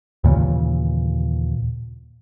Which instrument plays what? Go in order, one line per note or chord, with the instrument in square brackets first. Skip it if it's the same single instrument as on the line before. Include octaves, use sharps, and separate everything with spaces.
[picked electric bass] D#2 A#2 C#3 E3